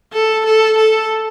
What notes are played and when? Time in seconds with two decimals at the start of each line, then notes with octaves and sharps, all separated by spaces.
0.13 A4
0.46 A4
0.78 A4